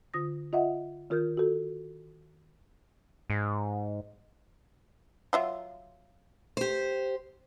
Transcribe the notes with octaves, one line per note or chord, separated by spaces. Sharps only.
D3 F4 D#6 A#6
F4 D#5 E5 F#5
D#3 F4 A#4 F6 G6
F#4 A4
G#2
F#3 F4 E5
G4 C5